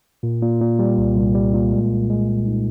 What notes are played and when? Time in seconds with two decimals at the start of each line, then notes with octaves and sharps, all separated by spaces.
0.23 A#2
0.42 A#2
0.61 A#2
0.79 G3
0.97 C2
1.16 C2
1.35 G3
1.54 A#2
1.72 G#3
1.91 C2
2.10 G#3
2.28 G#3
2.46 D#4